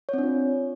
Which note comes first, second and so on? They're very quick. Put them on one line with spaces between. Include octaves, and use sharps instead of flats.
C#5 C4 D4 F4